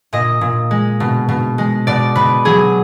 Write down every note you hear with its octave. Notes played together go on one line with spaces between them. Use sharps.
A#2 D#5
A#2
G#3
B2
B2
G#3
B2 D5
B2 B4
F#3 G#4